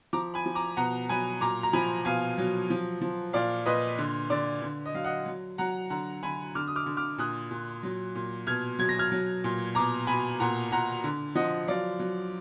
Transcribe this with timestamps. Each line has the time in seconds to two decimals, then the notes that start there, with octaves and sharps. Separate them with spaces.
0.13 F3 A#5 D6
0.34 G#5 B5
0.46 F3
0.55 A#5 D6
0.77 B2 F#5 A#5
1.09 F#3 G#5 B5
1.41 A#2 A#5 D6
1.63 A#5
1.73 F3 G#5 B5
2.05 B2 F5 G#5
2.38 F#3
2.70 F3
3.02 F3
3.33 A#2 D5 F5
3.66 A#2 B4 D#5
3.99 D3
4.30 D3 D5
4.62 D3
4.86 D#5
4.94 F#3 F5
5.04 D#5 F#5
5.26 F#3
5.58 F#3 F#5 A#5
5.90 D3 F#5 A#5
6.23 D3 G#5 B5
6.55 D3 D6 F6
6.67 D#6
6.76 D6 F6
6.86 D3
6.97 D6 F6
7.18 A#2 D#6 F#6
7.51 A#2
7.83 F#3
8.15 A#2
8.47 B2 F6 G#6
8.79 F#3 G#6
8.89 A#6
8.99 F6 G#6
9.12 F#3
9.44 A#2
9.75 B2 A#5 D6
10.07 B2 G#5 B5
10.40 A#2 F#5 A#5
10.72 A#2 F#5 A#5
11.04 D3
11.35 F3 D#5 F#5
11.68 F#3 D5 F5
12.00 F#3